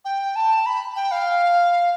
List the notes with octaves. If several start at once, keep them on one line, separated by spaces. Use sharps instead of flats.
G5
A5
B5
G5
F5